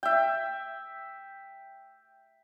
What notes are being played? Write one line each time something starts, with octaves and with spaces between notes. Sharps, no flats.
E5 G5